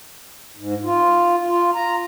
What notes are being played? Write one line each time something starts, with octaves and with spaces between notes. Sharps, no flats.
G#2
F4
F4
A#5